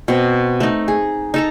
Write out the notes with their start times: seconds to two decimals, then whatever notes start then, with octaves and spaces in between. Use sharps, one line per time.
0.08 B2 C4
0.60 A3 D#4
0.88 G#4
1.34 D#4 A4 A#5